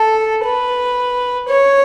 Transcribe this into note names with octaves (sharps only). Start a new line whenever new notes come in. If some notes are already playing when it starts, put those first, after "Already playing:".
Already playing: A4
B4
C#5